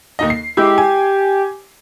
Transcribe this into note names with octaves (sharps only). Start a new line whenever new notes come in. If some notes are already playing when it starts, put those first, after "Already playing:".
D#2 D#4 D#5
C7
G#3 E4 G4
G#5